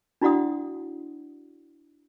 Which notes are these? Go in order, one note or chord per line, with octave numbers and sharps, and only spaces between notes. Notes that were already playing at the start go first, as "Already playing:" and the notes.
D4 E4 F#4 D5 F#5 D#6